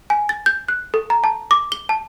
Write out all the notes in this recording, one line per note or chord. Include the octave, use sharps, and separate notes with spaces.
G#5
A6
G6
F#6
A4
A#5
A5
D6
G7
A5